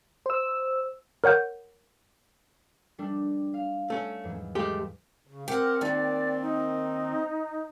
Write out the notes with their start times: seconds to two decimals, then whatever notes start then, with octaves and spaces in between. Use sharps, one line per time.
0.26 C5 E6
1.24 A#4 C#5 F#5 G6
2.98 G3 A3 D4
3.54 F5
3.90 A3 C#4
4.24 E2 G#2 F#3
4.55 G#3 A3 G4
5.27 C#3
5.48 C4 G4 A#4 F#5
5.81 D#2 D#3 D5
6.42 D#4